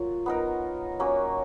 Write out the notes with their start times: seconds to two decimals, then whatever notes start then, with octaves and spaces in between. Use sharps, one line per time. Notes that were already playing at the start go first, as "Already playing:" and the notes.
Already playing: F#3 A#3 F4
0.26 B3 D#4 A#4
1.00 F#3 A#3 C#4